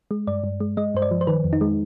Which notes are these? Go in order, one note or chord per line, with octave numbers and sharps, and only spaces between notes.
G#3
G2 D5
G2
G#3
G#3 D#5
G2 C5
D5
F3
C5
D#3 B4
F2
D#4
G#3